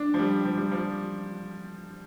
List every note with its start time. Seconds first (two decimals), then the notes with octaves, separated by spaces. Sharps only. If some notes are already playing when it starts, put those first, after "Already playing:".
Already playing: D4
0.14 F3
0.19 G3
0.45 F3
0.58 G3
0.72 F3